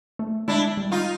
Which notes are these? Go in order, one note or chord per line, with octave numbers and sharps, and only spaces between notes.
A3
G#3 D4 E4
G3
D#4 F4